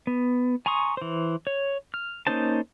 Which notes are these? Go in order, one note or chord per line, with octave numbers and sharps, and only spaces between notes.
B3
G#5 A#5 C6 C#6 D#6
E3 C5
C#5
F6
A#3 C#4 D#4 C5 A5